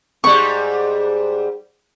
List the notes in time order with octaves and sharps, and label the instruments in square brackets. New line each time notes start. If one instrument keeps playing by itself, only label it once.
[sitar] G#2 G3 [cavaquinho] C#6